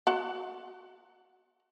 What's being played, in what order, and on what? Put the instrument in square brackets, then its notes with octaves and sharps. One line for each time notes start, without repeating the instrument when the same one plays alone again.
[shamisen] F#4 F#5